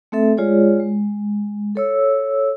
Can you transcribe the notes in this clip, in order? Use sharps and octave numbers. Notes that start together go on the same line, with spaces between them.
A3 C4 A4 E5
G#3 F4 G#4 C#5 D5
G#3
A4 C#5 E6